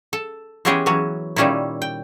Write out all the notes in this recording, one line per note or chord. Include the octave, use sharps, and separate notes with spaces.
A4
E3 G#3 B3 C#4 G4 G#4
E3 F#3 C#4
A#2 D#3 G3 C#4 D#4 E4
G5